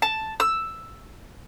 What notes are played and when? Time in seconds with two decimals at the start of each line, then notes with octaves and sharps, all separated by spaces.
0.02 A5
0.40 E6